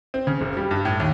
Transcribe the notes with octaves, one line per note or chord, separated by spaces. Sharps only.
C4
C#3
F#1
G3
G2
A2
D#2